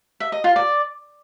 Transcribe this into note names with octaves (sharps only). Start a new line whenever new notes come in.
E5
D#5
F4
D5